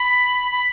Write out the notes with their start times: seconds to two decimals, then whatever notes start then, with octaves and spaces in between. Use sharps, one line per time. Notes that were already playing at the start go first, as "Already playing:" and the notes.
Already playing: B5
0.52 B5